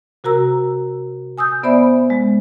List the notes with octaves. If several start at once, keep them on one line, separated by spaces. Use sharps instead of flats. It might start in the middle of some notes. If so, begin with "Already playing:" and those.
C3 F#4 A#4 A#5 E6
G#5 D#6 E6 G6
B3 C5 D5 E5 B5
G#3